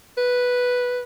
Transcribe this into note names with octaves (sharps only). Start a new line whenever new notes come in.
B4